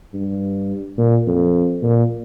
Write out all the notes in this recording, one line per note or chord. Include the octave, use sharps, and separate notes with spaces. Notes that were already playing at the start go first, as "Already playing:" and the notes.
G2
A#2
F2
A#2